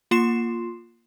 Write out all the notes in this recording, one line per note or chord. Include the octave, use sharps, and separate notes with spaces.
A#3 F4 C6 C7 E7